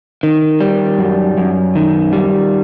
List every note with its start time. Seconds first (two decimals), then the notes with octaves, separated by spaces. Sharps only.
0.23 D#3
0.61 G3
0.99 F#2
1.38 F#2
1.75 D#3
2.13 G3